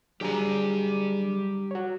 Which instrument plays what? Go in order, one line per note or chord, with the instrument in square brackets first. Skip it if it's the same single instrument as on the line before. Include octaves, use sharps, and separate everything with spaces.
[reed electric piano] F#3 D4 G#4 [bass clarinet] G3 [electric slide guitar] G4 A#5
[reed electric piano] F#4 C#5